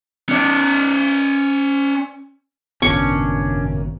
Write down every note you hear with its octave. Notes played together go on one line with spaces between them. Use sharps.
C#4 D5
G#1 F#2 A#2 C#3 B3 C#4 D4 C#6